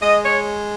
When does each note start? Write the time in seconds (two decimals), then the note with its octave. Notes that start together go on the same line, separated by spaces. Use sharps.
0.02 G#3 D#5
0.24 C#5